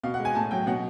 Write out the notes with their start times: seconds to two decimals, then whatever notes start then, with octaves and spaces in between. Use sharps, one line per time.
0.03 B2 F5
0.14 F#5
0.20 G#3
0.25 G#5
0.35 A2 A5
0.51 F#3 G5
0.67 B2 F#5